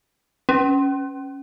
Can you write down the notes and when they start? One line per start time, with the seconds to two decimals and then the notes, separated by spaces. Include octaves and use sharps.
0.49 C#4